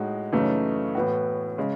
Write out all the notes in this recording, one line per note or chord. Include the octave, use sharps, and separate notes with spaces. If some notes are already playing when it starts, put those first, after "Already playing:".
Already playing: A2 G#3 D#4 F#4
F#2 C#3 E3 A3 D#4
A2 E3 B3 F#4
C#3 G#3